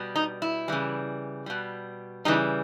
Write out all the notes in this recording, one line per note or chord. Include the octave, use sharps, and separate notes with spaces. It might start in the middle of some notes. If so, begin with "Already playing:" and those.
Already playing: B2 G3
D#4
E4
C#3 E3 G3
B2 G3
C#3 E3 G3 D#4